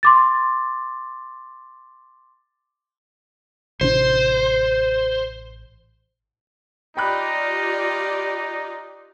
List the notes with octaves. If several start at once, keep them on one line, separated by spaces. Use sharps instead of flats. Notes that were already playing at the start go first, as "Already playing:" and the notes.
C6 D6 A6
A1 C3 D4 C5
D#4 F4 G4 D5 G5 B5 F#6